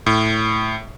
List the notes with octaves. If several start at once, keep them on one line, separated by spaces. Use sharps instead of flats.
A2